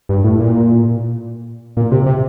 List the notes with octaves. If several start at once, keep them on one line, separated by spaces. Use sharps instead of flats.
G2
A2
A#2
A#2
C3
C3